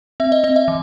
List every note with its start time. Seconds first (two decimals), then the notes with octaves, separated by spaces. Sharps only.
0.20 C4 E5
0.32 D#5
0.44 C4 D#5
0.56 E5
0.68 E3